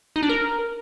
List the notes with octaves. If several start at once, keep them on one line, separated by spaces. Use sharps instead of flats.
D#4
D4
A#4